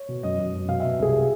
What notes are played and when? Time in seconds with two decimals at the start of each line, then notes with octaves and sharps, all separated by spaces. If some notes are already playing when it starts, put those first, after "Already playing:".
Already playing: C#5
0.08 B2
0.23 F#2 D#5
0.39 F#2
0.54 F#2
0.68 B2 F5
0.80 B2 E5
0.99 C2 G#4